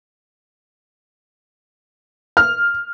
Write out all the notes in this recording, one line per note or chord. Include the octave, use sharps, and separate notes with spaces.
F6